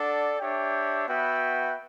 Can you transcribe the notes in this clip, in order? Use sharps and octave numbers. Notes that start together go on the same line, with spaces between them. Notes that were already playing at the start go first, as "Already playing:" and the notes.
Already playing: D4 A4 D5 F#5
D4 G4 C#5 E5 G5
B3 F#4 B4 E5 G5